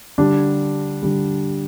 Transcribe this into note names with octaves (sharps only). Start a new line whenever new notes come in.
D3 G3 D4
D3 G3